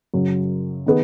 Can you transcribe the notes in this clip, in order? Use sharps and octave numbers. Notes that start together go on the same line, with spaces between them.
F#2 C#3 F#3
D#3 B3 G#4